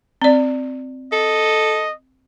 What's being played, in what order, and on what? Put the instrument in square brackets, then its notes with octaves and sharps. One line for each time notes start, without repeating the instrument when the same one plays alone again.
[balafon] C4 D5
[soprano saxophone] A4 [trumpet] D#5